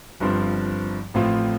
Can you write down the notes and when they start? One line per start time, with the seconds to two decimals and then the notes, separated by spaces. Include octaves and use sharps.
0.20 G1 G2 F3 C4
1.14 A1 A2 F3 C4 F4